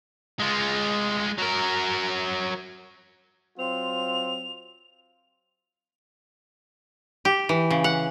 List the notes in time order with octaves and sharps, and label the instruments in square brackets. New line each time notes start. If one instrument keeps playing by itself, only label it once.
[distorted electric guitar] G#3 F4
F#3 A#4
[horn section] F#3 C4 F4 [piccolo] F7
[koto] G4
E3
C#3
F#5